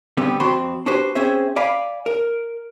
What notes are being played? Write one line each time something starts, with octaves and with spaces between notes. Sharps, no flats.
D3 G3 B3 C4
F2 C4 F#4 A5 B5 C6
D4 F#4 G4 B4 C5
C4 C#4 G#4 C5 E5
D5 F5 G#5 B5
A#4